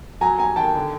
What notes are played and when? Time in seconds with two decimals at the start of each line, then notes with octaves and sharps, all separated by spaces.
0.21 F#3 G#5 A#5
0.39 D#2 G#5 A#5
0.56 D#3 G5 A5
0.75 D3